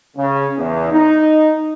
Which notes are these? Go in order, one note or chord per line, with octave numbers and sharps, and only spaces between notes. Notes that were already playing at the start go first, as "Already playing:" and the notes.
C#3
E2
D#4